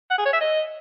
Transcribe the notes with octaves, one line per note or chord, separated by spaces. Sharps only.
F#5
G#4
C#5
E5
D#5